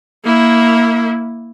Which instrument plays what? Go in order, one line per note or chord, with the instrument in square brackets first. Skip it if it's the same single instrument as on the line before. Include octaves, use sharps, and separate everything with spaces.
[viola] A#3 E4